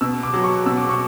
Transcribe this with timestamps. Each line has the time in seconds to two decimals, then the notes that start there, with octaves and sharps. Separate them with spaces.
0.01 B2 E6
0.23 D6
0.34 F#3
0.44 C#6
0.66 B2 E6
0.77 D6
0.89 C#6